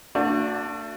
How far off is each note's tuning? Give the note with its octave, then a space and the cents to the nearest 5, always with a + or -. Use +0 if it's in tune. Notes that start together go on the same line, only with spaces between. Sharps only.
A3 +40 D4 +0 F#4 -20